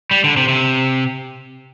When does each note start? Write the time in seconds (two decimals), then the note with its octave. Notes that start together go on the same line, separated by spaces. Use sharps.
0.11 G3
0.24 D3
0.37 C3
0.49 C3